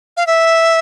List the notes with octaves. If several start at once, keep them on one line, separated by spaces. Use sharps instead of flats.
F5
E5